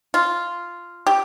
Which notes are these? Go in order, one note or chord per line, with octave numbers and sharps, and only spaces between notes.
F4
G4